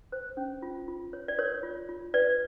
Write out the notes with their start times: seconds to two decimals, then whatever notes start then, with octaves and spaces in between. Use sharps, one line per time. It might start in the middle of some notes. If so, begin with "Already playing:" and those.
0.12 C5
0.37 C#4
0.62 F4
0.88 F4
1.13 C#5
1.28 D5
1.38 A#4 C#5
1.63 F4
1.89 F4
2.14 B4 D5